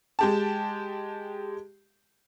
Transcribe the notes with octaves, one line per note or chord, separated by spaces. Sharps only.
G#3 G4 A5